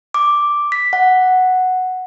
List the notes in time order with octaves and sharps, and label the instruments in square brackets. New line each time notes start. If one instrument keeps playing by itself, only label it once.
[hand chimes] D6
B6
F#5